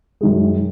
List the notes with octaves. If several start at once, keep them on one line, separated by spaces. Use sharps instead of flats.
F#2 D#3 G#3